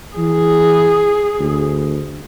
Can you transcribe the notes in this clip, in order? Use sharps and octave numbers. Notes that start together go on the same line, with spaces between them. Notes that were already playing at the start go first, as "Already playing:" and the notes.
E3 G#4
D2